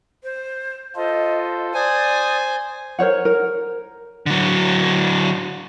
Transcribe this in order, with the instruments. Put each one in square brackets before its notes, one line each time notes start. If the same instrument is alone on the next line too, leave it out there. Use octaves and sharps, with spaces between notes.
[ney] C5
[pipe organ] F4 A4 C5 [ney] D#5
[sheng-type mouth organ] C5 G#5 [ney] D5 [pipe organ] D#6
[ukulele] A#4 C5 C#5 F#5
A#4
[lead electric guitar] D3 F#3